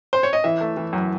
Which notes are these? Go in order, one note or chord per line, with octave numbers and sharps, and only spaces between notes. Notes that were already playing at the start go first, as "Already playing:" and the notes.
C5
C#5
D#5
E3 E5
A3
E3
F#2